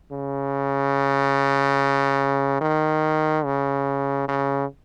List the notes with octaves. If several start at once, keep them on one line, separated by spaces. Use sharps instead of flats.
C#3
D#3
C#3
C#3